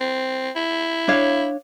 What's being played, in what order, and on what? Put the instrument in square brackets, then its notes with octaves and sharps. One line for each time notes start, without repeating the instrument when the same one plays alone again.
[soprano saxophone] C4
E4
[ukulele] D4 C#5 F5